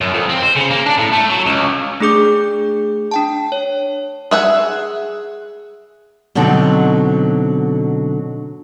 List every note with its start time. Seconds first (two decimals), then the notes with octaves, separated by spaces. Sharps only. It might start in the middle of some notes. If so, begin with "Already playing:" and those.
0.01 F#2
0.14 F2
0.30 C4
0.43 C5
0.56 C#3
0.71 A#3
0.86 D4
0.98 A2
1.12 A3
1.30 F#3
1.46 C#2
2.00 A3 D4 G#4 D6 G6
3.11 D4 G5 A5
3.52 C#5
4.31 G#4 E5 F#5
6.35 B2 D3 F#3 C4 D#4